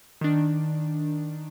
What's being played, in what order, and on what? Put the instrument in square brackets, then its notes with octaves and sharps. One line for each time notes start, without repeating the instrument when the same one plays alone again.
[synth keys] D#3 D4